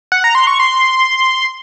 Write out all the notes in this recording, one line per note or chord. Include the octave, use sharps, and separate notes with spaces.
F#5
A#5
C6
C#6
C6